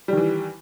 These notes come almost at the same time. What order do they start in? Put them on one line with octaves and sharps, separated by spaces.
G3 D#3 E3